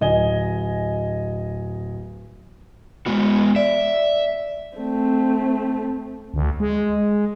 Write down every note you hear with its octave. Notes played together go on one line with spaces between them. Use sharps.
D1 D#5 G#5 G7
G#3 B3 F#4
D5 E5
A3 C4
D2
G#3